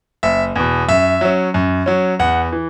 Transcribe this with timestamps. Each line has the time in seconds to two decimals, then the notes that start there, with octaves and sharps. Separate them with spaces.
0.23 F#1 E5
0.56 E2 B2
0.88 F#2 E5
1.21 F#3 C#4
1.54 F#2
1.86 F#3 C#4
2.19 E2 F#5
2.52 E3